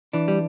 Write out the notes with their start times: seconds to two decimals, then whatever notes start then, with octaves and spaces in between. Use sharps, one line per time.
0.13 E3 D4
0.28 G3